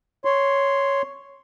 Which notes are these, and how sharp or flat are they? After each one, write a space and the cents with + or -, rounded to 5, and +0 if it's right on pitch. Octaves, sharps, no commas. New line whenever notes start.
C#5 +0 C6 +0